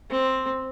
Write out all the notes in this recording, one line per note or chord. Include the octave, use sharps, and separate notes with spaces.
C4